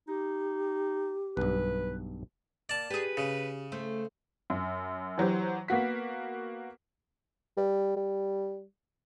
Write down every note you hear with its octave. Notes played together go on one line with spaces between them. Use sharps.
D#4 G4
B1 G2 B4
A#3 D5 A5
G4 G#4 B4
C#3
A3 C5
F#2
E3 F#3 G4 C5
A#3 B3 F#4 B6
G3
G3